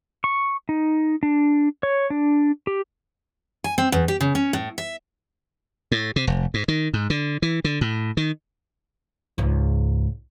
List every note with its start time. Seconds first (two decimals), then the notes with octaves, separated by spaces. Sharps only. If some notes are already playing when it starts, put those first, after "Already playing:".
0.24 C#6
0.69 D#4
1.23 D4
1.83 C#5
2.10 D4
2.67 G4
3.64 G#5
3.78 C4
3.92 E2
4.08 G4
4.21 C#3
4.35 C#4
4.53 A2
4.78 E5
5.92 A2
6.16 C3
6.27 F1
6.54 G#2
6.68 D#3
6.94 G#2
7.10 D3
7.42 E3
7.64 D3
7.81 A2
8.17 D#3
9.38 C#2 G#2